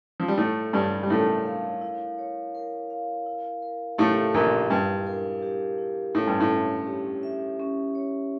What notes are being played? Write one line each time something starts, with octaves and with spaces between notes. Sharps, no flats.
F3
G3
A2 A3 E4
G2 G3 C#5
G3
A2 A3 A#4
F5
E4
C#5
A#4
F5
E4
A#4
A2 A3 G4
A#1 A#2 E4
G2 E4
A#4
G4
E4
A2 C#4
G2
A2
C#5
G4
E5
C#4
C#5